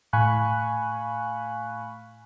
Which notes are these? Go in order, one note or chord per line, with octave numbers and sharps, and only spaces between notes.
A2 F5 G#5 B5 C#6 F#6